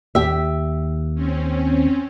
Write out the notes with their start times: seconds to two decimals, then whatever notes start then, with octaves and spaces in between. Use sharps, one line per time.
0.15 D#2 G4 E5
1.15 C4 C#4